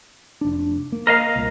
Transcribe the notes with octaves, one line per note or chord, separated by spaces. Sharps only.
F1 D4
A#3
A#4 D#5 F5
C2 A#2